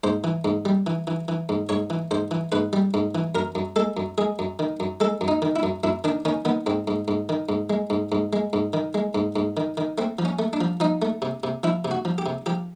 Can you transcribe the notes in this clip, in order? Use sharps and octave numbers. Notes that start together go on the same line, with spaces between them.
G#2 C5
E3
G#2
G3
E3
E3
E3
G#2
G#2 C#5
E3
G#2 C5
E3
G#2 B4
G3
G#2
E3
F#2 A#4
F#2
G#3 A4
F#2
G#3 G#4
F#2
D#3
F#2
G#3 A4
F#2
D#4
D#3
E4
F#2
F#2 E4
D#3 D4
D#3 C#4
D#3 B3
G#2 C4
G#2
G#2
D#3
G#2
G#3
G#2
G#2
G#3
G#2
D#3
G#3
G#2
G#2
D#3
D#3
A3 C4
F3
C#4
A3
D4
F3
F3 D#4
A3
C3
C3
F3 E4
C3
F#4
F3
G4
C3
F3 G4